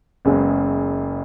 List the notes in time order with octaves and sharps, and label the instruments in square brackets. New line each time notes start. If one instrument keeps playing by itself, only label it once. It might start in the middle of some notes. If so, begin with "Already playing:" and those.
[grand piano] F#1 F#2 C#3 G#3 B3